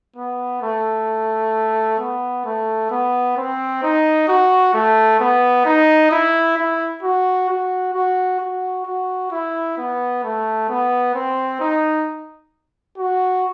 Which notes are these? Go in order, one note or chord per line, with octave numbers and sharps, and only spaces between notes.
B3
A3
B3
A3
B3
C4
D#4
F#4
A3
B3
D#4
E4
E4
F#4
F#4
F#4
F#4
F#4
E4
B3
A3
B3
C4
D#4
F#4